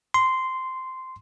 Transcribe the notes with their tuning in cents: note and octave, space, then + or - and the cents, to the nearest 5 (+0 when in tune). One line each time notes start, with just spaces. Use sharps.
C6 -10